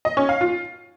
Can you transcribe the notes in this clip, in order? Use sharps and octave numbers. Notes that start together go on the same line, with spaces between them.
D#5
C#4
F5
F4